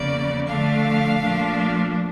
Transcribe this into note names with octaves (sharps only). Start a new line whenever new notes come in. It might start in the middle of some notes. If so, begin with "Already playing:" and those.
Already playing: E2 C#3 F3 A#3 D5
D3 F3 A3 D4 F5
A#2 F3 A3 D4